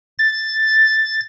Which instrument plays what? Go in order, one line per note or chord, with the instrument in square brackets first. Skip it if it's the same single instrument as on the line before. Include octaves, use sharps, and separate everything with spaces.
[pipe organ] A6